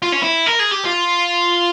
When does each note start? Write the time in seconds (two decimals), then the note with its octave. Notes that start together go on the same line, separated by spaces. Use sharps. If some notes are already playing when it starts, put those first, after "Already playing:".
0.02 F4
0.12 C#4
0.22 E4
0.47 A#4
0.60 G#4
0.72 G4
0.85 F4